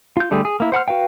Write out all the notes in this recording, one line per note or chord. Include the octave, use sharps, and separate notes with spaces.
F4 G6
D3 G3 A3 G4 G#4
G#4
A#3 E4
C5 F#5 B5 F6
F#4 B4 F5 G5